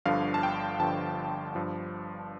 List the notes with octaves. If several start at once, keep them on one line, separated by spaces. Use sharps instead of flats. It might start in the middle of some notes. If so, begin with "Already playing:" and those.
G1 G2 D3 F3 F5
A5
G5
G1 G2 D3 F3 A5
G1 G2 F3